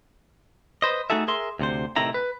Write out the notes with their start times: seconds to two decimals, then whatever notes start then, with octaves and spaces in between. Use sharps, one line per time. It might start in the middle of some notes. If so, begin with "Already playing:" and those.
0.82 B4 C5 D#5
1.10 A3 D#4 F#4 G#4 A4 E5
1.28 G#4 A#4 E5 C6
1.59 D2 C3 C5
1.96 A2 C3 D#3 C4 E4 A#5
2.14 B4